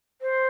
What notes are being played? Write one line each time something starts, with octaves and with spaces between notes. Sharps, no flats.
C5